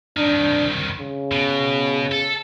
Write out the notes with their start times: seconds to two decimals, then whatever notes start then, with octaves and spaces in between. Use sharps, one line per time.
0.17 C2 D#3 D4
0.99 C#3
1.32 B2
2.11 A4